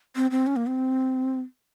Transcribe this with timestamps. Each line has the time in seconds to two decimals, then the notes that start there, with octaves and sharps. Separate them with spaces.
0.16 C4
0.31 C4
0.47 C#4
0.56 A#3
0.67 C4